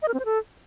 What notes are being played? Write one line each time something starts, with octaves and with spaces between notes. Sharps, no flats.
D#5
A#4
C4
C5
A4